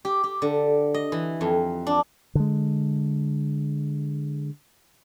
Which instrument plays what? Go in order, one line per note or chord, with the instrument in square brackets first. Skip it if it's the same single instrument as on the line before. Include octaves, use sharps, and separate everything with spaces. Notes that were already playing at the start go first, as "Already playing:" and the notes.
[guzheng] G4
G4
D3
D#5
E3
F2
D4
[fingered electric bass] D3 G#3